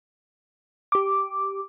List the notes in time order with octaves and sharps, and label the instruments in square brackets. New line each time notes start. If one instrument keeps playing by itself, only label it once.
[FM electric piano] G4 D6